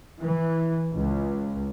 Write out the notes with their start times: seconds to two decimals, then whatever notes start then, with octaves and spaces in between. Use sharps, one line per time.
0.20 E3
0.94 C#2